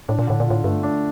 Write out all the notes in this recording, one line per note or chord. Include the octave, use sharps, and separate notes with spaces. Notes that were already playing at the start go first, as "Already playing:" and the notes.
A2 D4
A#2
A2 D3
A#2
A2 F4
G2 A3
D4